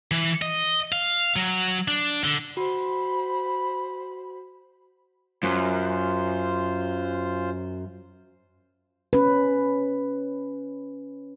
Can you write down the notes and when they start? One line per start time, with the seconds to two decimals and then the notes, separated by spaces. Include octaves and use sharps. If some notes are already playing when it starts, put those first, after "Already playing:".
0.11 E3
0.42 D#5
0.92 F5
1.36 F#3
1.88 D4
2.24 D3
2.57 F#4 C5 B5
5.43 F#2 F4 C5
9.13 C#4 B4